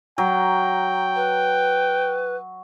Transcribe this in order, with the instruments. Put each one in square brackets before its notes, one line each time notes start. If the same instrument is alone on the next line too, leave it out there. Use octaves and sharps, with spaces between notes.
[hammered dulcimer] F#3 [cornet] G5
[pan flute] B4